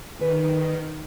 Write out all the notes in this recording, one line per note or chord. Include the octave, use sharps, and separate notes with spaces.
D3 D#3 G#4 B4